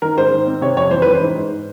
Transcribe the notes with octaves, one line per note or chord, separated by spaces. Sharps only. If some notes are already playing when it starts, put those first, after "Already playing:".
D#3 A#4
G#2 C5
D#3
C4
C3 C#5
F2 C#5
E3 C5
E3 B4
C5
G#2
G#2